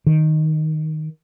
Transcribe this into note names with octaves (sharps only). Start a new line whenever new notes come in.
D#3